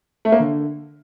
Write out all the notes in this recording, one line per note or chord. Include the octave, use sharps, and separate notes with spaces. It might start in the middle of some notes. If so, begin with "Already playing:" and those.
A3
A#3
D3